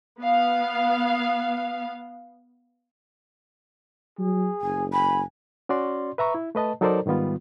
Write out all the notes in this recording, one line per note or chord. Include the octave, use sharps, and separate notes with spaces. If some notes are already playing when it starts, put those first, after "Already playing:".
B3 F5
F#3 G#4
F#1 G#5
G#5 B5
C#4 F#4 D5 C6
B4 E5 A#5 C#6
E4
A3 B4 D#5 A5
F#3 D#4 A4 A#4 C5 D5
G#2 D#3 G3 B3 F4